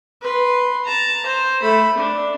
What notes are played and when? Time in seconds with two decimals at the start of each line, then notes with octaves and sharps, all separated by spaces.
0.22 B4 C6
0.84 A5 A#5
1.27 C5
1.62 A3 B5
1.98 D4